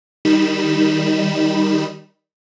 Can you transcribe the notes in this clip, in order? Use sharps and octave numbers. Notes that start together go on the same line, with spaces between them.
D#3 G3 D#4 B5 E7